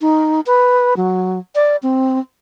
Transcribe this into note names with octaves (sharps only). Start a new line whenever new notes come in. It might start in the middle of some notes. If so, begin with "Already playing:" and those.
D#4
B4
F#3
D5
C4